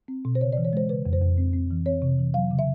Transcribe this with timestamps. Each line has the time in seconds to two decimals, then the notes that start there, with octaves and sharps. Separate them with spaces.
0.08 C4
0.25 B2
0.35 C5
0.41 C#3 C#5
0.53 D5
0.58 E3
0.65 C#5
0.73 G#3 C5
0.89 C#3 B4
1.06 F2
1.13 C5
1.22 F2
1.38 C4
1.54 C4
1.71 E3
1.86 C4 C#5
2.02 C3
2.19 E3
2.34 F#3 F5
2.51 C#3
2.59 E5